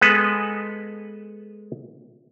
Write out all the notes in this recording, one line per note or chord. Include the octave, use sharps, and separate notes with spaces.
G#3 B3 A4 B4